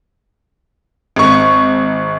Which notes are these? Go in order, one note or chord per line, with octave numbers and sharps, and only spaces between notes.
G#1 C#6